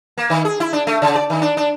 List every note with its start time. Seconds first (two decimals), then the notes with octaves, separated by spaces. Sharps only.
0.18 A#3
0.30 D#3
0.45 G#4
0.60 E4
0.73 D4
0.87 A3
1.02 C#3
1.15 D5
1.30 D#3
1.42 D4
1.57 D4